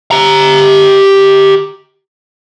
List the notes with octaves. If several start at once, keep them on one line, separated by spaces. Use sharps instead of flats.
G4 A#5